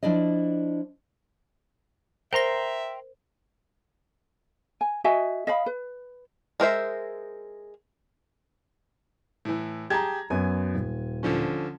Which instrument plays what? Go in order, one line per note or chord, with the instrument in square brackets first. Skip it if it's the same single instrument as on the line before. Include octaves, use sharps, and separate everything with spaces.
[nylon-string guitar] F3 D4 E4 D5 D#5
[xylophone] A#4 A#6 [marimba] C5 [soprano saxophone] E5 [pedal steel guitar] G5 A#5 C6
[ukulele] G#5
F#4 D#5 E5 G#5
D#5 F5 B5
B4
[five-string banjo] G#3 A#4 C5 E5
[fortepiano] A2 E3
[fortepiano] G4 G#4 A5 [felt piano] A#5 G#6
[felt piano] F#2 B3 [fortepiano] G#5
[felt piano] D#1
[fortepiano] D3 F3 C#4